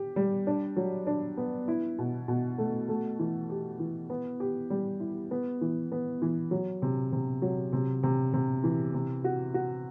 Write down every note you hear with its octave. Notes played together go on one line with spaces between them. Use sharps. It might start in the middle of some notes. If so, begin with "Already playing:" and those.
Already playing: G4
G3
D4
F#3
D4
B3
E4
B2
B2
A3
A3
E3
G4
E3
B3
G4
G3
E4
B3
E3
B3
E3
F#3
C3
C3
F#3
C3
C3
C3
E3
C3
F#4
F#4